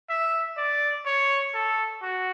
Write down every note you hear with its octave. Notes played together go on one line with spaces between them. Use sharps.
E5
D5
C#5
A4
F#4